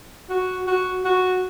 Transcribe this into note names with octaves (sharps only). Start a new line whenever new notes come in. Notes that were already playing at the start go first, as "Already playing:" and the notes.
F#4
F#4
F#4